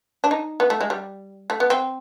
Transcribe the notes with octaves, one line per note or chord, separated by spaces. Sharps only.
D4
D#4
B3
A3
G#3
G3
A3
B3
C4